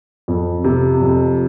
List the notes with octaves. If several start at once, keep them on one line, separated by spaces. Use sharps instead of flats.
F2
C3
F2